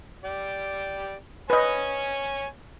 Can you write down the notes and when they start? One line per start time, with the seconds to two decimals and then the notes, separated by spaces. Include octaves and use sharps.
0.24 G4 D5
1.50 B4 C#5 D#5 G#5